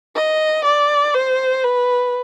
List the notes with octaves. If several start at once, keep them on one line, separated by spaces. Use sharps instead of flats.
D#5
D5
C5
B4